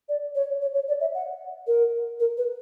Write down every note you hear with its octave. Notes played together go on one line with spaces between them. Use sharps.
D5
C#5
C#5
C#5
D5
E5
F#5
A#4
A#4
B4